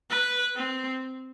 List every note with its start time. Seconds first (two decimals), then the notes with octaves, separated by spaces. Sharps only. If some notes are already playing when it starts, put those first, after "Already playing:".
0.10 B4
0.55 C4